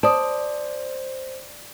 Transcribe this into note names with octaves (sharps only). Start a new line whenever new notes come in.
C5 D5 A5 D#6